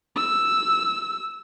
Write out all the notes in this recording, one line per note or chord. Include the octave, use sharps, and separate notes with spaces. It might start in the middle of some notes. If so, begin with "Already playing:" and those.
E6